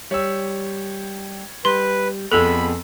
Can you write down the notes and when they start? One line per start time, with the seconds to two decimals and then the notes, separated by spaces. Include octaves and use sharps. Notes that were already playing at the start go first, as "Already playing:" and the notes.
0.11 G3 C#5 E6
1.65 G3 B4 C6
2.32 F2 B3 G#4 A4 B5 E6 F#7